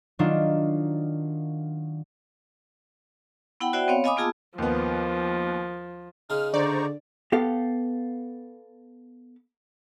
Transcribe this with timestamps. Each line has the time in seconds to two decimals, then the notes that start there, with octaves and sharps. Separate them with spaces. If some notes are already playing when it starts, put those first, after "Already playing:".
0.19 D#3 F#3 D4 D#4 F4
3.60 B3 E4 F#5 G5 B5
3.73 F#4 C5 D5 E5 F#5 G5
3.88 B3 C4 C#5 F5
4.04 D#5 F5 G#5 B5 D6 D#6
4.16 A#3 B3 F4 G#4 A5 E6
4.58 D#2 F3 B3
6.30 C#3 D#4 C6 F6
6.54 D3 C5 D5 A#5 C#6
7.32 B3 G4 A4 F5